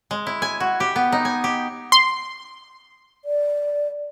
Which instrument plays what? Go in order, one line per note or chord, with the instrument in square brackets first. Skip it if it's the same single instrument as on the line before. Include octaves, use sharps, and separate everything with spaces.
[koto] G#3
E4
G#5
F#4
G4
B3
D#4
G#5
G4
[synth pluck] C6
[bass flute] D5